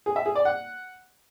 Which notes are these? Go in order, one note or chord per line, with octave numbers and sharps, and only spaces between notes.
G#4
E5
G#4
D5
F#5